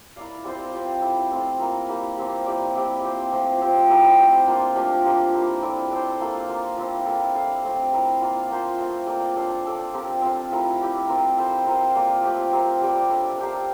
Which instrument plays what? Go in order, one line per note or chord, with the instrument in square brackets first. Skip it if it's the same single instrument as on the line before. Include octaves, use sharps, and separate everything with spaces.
[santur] E4 A#4 D5 F5
G3 C4 F4 C5
C4 G4 D5
E4 A4 E5
A3 C4 F4
A#3 E4 A#4
G3 A#3 E4 G4
F3 C4 G4
A#3 E4 G4 D5
F3 C4 E4 G4
C4 G4 C5
F3 A3 C4
F3 C4 G4
A3 E4 G4 A#4
C4 G4 C5
A#3 D4 F4
F3 A3 D4 G4
F3 A#3 D4 G4
G3 A#3 E4 A#4
C4 E4 A4 D5
D4 A4 C5
A#3 F4 A4
A#3 F4 A#4
F3 C4 E4
A#3 E4 A4
E4 A4 D5 F5
A3 C4 F4
E4 A#4 F5
A#3 D4 F4
F3 A#3 F4 C5
A3 C4 F4
A#3 F4 A4 D5
D4 A4 D5 F5
D4 A4 D5
F3 C4 G4 A#4
C4 F4 A4
F3 A3 E4 A#4
E4 G4 D5
C4 F4 A#4
E4 A4 C5 E5
C4 F4 A#4 E5
A#3 F4 A4 D5
A3 C4 G4
C4 G4 A#4
G3 C4 G4 D5
D4 A4 E5
D4 G4 A#4 F5